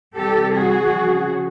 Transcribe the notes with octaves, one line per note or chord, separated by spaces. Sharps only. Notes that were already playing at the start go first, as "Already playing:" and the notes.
C3 E3 G3 G4 A4
F#4 G#4
C#3 F3